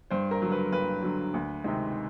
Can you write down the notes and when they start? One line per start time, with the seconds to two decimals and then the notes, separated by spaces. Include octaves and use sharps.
0.11 G2 C5
0.31 A#4
0.42 D3 F#3
0.52 B4
0.72 G2 B4
1.03 D3 F#3
1.34 D2
1.64 C3 D#3 G#3